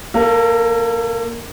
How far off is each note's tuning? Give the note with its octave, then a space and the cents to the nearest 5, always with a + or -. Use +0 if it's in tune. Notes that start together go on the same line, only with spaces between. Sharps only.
A#3 +0 A4 +30